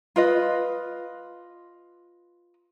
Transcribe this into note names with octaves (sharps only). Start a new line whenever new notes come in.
F4 B4 D#5